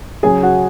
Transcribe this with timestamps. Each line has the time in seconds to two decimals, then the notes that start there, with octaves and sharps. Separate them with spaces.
0.23 C#3 F#3 C#4 G#4 G#5
0.43 F#4 F#5